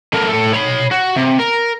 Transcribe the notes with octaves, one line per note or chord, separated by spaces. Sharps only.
A3 A#4
A2 A4
C#5 B5
F#4
C3
A#4